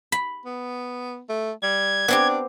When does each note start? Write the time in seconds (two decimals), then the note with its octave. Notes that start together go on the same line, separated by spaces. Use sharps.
0.12 B5
0.45 B3
1.29 A3
1.63 G3 G#6
2.08 B3 C4 D4 G4